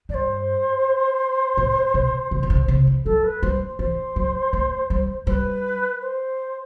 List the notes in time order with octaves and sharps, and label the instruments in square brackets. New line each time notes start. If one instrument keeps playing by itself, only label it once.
[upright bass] G2 [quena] D5
[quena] C5
[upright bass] A2
B2
C3
C3
D3
C3
E3
[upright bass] F#3 [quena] A4
[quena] B4
[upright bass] G3 [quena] C5
[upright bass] E3 [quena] C5
[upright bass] F#3
A3
G3
[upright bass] G3 [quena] B4 C5
[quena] C5